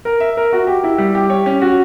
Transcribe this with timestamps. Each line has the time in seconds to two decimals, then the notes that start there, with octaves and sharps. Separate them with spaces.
0.05 A#4
0.20 E5
0.37 A#4
0.53 F#4
0.67 G4
0.84 E4
0.98 G3
1.15 G4
1.30 C#5
1.46 C#4
1.62 F#4